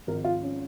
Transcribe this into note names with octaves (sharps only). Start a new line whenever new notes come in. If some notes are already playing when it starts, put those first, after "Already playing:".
G#1 G#2 F3 A#4
F4
C#4